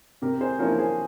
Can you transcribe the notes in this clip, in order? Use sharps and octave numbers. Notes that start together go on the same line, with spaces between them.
C3 G4 A#4
A#4
G#4 C5
F3 A#3 C#4 E4 A#4 C#5
G#4 C5